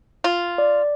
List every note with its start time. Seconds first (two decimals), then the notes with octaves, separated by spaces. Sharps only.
0.24 F4
0.58 D5